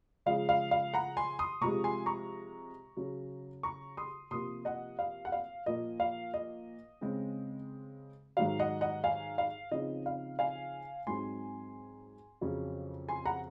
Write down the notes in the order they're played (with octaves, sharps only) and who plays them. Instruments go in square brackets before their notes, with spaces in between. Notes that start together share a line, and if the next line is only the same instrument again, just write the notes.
[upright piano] C#3 F3 G#3 F5
F5
F5
F#5 A#5
G#5 C6
C6 D#6
C3 F3 G#3 A#5 C#6
G#5 C6
A#5 C#6
C#3 F#3 C#4
A#5 C#6
C6 D#6
C3 F3 A#3 C6 D#6
D#5 F#5
F5
F#5
F5
A#2 F3 A#3 D#5
F5
D#5
C#3 G#3 C4
G#2 D#3 F#3 F5
D#5 F#5
D#5 F#5
F5 G#5
F5
C#3 F3 C4 D#4 D#5
F5
F5 G#5
G#2 F#3 C4 D#4 G#5 C6
F2 C#3 F#3 C#4
G#5 C6
F#5 A#5